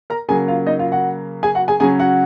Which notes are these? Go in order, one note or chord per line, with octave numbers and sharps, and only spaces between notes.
A#4 A#5
C#3 F#3 A#3 G#4 G#5
F4 F5
D#4 D#5
F4 F5
F#4 F#5
G#4 G#5
F#4 F#5
G#4 G#5
C#3 F#3 C#4 G#4 G#5
F#4 F#5